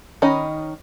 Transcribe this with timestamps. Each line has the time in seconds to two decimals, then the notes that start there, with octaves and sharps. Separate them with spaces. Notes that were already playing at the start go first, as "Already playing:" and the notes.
0.22 D#3 C#4 D#4 B5